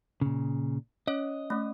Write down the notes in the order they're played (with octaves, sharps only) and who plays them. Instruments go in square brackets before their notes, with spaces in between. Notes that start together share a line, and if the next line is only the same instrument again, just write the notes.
[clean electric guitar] A#2 C#3
[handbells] C#4 C#5 [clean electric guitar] D#5
[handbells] A3 C#4